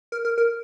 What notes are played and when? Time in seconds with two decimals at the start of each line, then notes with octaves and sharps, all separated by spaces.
0.12 A#4
0.25 A#4
0.38 A#4